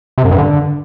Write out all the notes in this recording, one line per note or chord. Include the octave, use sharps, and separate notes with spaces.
C3
F#2
G2
D3